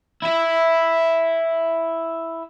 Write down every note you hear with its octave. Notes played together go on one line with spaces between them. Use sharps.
E4 E5